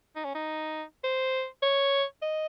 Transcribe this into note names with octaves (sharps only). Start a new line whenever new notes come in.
D#4
C#4
D#4
C5
C#5
D#5